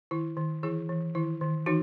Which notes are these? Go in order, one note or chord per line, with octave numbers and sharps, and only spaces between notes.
D#3 E4
D#3
E3 E4 G#4
E3
D#3 E4
D#3
E3 D#4 F#4